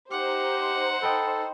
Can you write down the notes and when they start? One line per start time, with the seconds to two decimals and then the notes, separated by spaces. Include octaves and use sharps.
0.11 D#4 G4 C5 F#5
1.03 A4 D#5 G5 B5